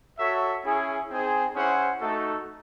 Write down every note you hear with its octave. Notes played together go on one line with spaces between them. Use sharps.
F#4 A4 C#5 E5
C#4 E4 G#4
C4 D#4 G#4 C5
C#4 E4 G#4 C5 F#5
A3 D#4 F#4 A4